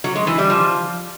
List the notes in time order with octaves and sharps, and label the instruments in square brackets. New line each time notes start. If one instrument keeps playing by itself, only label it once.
[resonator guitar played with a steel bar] F#3
G#3
E3
G3
F3